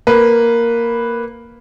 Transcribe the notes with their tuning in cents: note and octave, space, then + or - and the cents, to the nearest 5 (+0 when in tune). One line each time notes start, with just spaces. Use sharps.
A#3 +0 B4 +0